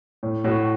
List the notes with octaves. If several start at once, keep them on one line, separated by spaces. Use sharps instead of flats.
A2
A2 F#4